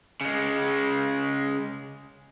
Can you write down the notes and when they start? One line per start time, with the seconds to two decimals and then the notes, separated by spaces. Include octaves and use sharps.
0.21 C#3 G#3